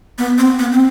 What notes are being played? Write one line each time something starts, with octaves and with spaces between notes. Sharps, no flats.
B3
C4
B3
C4